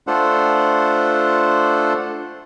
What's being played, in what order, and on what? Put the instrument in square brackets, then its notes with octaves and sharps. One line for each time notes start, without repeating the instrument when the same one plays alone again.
[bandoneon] A3 D4 F4 A4 C5 F#5